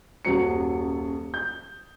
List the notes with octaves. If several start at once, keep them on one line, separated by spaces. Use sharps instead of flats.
D#1 F#2 F#3 C#7
G6